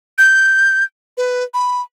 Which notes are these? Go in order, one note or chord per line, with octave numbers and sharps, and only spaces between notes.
G6
B4
B5